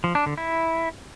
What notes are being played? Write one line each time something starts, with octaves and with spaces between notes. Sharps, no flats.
F3
D4
D3
E4